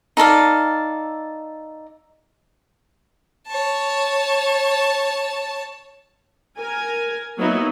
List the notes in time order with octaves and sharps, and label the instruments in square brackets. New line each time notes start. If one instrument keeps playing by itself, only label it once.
[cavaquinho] D#4 A4 D5 F5
[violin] C#5 A5
[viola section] A#4 G#5
F#3 A#3 B3 D#4 E4